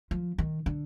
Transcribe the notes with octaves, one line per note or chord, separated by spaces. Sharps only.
F3
D#3
D3